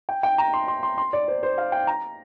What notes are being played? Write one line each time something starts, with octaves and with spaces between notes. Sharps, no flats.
G5
G5
A#5
C6
C6
C6
C6
D5
C5
C5
F5
G5
A#5